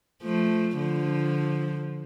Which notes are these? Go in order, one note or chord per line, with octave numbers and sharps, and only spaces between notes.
F3 A3
D3 F3